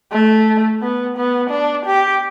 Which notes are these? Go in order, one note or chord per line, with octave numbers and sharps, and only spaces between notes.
A3
B3
B3
D4
G4